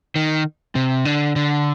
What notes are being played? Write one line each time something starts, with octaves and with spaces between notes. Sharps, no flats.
D#3
C3
D3
D3